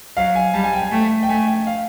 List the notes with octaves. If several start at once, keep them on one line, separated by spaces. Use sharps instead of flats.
F#3 F5
G#5
G3 A5
G#5
G5
G#5
A3 G5
G5
A3 G#5
G5
F5